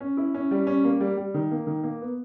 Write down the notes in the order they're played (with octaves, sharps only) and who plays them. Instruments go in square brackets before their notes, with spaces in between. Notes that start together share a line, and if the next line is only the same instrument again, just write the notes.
[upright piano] C#4
E4
C#4
G3
C#4
A#3
G3
G3
D#3
A#3
D#3
A#3
B3